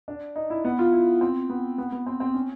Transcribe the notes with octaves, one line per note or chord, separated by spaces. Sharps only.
D4
D#4
E4
B3
F4
E4
C4
B3
B3
B3
C4
C4
C#4